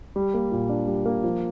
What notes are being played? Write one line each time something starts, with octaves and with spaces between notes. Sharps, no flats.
G3
A#3
A#2
D4
G3
A#3
F3